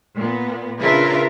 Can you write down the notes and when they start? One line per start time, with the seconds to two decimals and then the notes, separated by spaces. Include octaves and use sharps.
0.16 A#2 B3
0.79 C#3 D4 F4 A#4 B4 E5